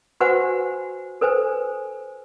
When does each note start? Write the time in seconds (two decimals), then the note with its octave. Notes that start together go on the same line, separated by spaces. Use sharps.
0.20 F#4 G4 B4 C5 F#5 G#5
1.21 A4 B4 C5 G#5